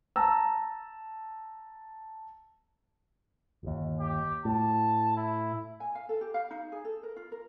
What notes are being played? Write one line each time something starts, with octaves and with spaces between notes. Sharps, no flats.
A5 A#5 E6
G1 D#2
G4
A2 A5
E4
G#5
F5
A4
G4
F5
D#4
G#4
A4
A#4
F4
A#4